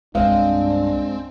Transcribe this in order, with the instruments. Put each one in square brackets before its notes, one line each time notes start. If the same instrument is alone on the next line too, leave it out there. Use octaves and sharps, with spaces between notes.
[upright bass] C2 G2 [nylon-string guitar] G#3 F5 [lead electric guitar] C4 [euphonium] D4